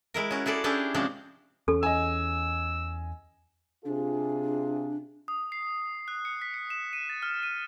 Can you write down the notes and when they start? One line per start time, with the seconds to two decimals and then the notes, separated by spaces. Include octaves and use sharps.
0.14 G#3 E4 A#4
0.31 C#4 F#4
0.46 E4 G#4 A4 D5
0.64 C#4 D4 E4 G4 G#4
0.94 C3 F3 G#3 C#4 D4
1.68 E2 C#4 A4
1.83 D#5 G#5 E6
3.85 C3 D4 F4 G#4
5.28 D#6
5.52 C7
6.08 F#6
6.25 C#7
6.42 B6
6.54 C#7
6.70 E7
6.93 D#7
7.09 A6
7.22 F6
7.43 D#7